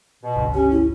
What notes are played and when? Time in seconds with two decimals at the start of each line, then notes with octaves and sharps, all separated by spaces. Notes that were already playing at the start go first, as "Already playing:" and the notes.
0.23 B2
0.36 G1 C#2
0.54 C#4 G4
0.71 E4